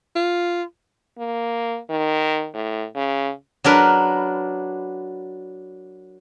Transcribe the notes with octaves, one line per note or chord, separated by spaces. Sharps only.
F4
A#3
D#3
A2
C#3
F#3 D4 A#4 B4